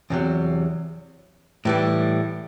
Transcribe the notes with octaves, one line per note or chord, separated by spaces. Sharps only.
E2 C3 F#3
A2 E3 G3